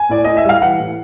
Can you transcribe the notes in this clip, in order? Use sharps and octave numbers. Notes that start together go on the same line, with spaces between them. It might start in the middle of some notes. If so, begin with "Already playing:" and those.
Already playing: G#5
A2 D5
A2 D#5
E5
G3 F5
E3 F#5
A2